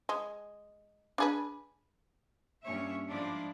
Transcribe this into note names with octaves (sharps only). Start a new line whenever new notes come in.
G#3
D4 G#4 B4
G2 A#2 C#4 C#5 E5
G#2 F3 D4 E4 D5